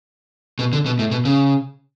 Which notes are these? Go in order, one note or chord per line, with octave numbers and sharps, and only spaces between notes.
B2
D3
B2
A2
B2
C#3